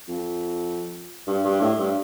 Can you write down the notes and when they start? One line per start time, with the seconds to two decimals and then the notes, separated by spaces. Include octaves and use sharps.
0.08 F2
1.27 G2
1.44 G2
1.61 A2
1.79 G2